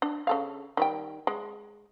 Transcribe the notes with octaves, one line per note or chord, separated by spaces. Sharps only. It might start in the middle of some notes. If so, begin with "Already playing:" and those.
D4
C#3 A4 F5
D#3 G3 G5
G#3